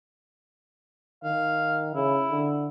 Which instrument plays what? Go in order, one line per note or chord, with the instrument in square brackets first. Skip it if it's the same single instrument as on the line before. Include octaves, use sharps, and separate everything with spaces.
[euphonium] D#3 [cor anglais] F5
[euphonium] C#3 [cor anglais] E4
[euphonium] D3